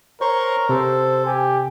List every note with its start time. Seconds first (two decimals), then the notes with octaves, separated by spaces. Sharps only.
0.21 A#4 C5 C#5 A#5 C6 C#6
0.69 C3 A4 C5
1.26 G4 G#5